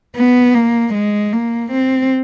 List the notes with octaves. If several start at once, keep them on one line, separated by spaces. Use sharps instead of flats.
B3
A#3
G#3
A#3
C4